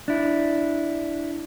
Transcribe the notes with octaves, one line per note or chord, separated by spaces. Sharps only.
D4 E4